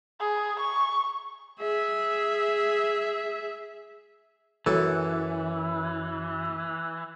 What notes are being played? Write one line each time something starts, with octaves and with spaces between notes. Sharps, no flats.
G#4
C#6
G#4 E5
F#2 E3 A4